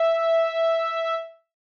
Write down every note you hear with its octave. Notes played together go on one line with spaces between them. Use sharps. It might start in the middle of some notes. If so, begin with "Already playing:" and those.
Already playing: E5